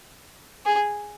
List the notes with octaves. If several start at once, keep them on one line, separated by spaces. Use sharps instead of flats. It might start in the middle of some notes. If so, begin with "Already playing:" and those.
G#4